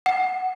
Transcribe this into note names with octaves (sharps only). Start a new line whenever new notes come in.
F#5